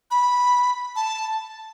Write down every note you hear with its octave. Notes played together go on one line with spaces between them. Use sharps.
B5
A5